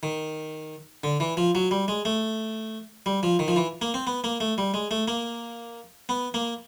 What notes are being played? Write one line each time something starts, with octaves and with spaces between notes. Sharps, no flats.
D#3
D3
E3
F3
F#3
G3
G#3
A3
G3
F3
D#3
F3
E3
A#3
C4
B3
A#3
A3
G3
G#3
A3
A#3
B3
A#3